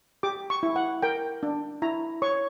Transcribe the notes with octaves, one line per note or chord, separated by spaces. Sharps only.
G4 D6
C#6
E4
F#5
A#4 G5
D4
E4 A#5
C#5 C#6